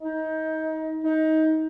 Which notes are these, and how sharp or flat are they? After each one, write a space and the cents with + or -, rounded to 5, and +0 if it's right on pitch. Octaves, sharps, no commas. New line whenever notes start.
D#4 +25
D#4 +20